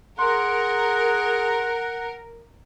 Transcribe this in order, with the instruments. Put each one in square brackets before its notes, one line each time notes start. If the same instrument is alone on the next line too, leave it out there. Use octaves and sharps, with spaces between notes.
[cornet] G#4 [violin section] A#4 [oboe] F#5 [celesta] C6